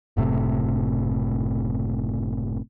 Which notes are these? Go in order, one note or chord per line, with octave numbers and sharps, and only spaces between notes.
F#1 A2 C3